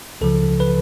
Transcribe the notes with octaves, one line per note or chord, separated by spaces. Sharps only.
C#2 C#3 F3 A4
B4